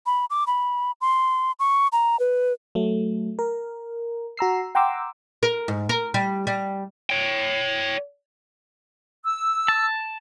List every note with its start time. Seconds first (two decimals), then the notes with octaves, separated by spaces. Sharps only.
0.06 B5
0.30 D6
0.47 B5
1.01 C6
1.59 C#6
1.92 A#5
2.20 B4
2.75 F#3 A3
3.39 A#4
4.37 F#4 A#5 E6 C7
4.75 F#5 G5 A#5 C6 D6 E6
5.43 A#4
5.68 G#2
5.89 A#4
6.14 G3
6.47 G3
7.10 C#5 G5
9.24 E6
9.68 A5